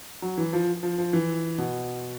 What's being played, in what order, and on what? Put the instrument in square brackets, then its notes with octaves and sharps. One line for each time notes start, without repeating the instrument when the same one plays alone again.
[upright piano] F#3
E3
F3
F3
F3
E3
B2